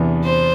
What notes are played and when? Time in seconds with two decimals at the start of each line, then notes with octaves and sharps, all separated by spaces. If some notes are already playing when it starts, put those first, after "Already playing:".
Already playing: E2 C3 E3 B3 D4
0.24 C5